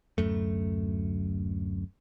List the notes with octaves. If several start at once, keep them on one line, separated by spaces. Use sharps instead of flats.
D1 C2 F#2 A3